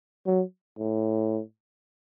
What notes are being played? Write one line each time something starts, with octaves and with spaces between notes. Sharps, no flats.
F#3
A2